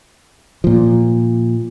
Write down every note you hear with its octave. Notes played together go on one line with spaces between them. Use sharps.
A#2 F3